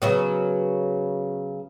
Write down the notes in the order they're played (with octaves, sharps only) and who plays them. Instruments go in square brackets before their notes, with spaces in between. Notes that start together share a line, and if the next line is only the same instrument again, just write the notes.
[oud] C#3 F#3 B3